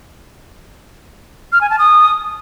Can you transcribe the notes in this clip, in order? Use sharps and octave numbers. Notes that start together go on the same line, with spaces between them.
F6
G#5
A5
D#6